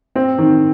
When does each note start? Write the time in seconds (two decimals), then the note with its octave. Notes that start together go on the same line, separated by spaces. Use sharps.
0.15 C4
0.38 D#3